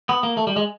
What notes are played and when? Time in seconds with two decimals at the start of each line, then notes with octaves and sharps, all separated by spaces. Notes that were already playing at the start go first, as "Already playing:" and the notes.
0.09 B3
0.23 A#3
0.37 A3
0.47 G3
0.56 G#3